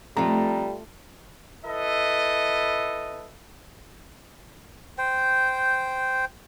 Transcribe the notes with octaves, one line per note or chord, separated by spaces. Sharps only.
F2 G3 A3 F4 A#5
E4 A4 B4 D#5
C5 G5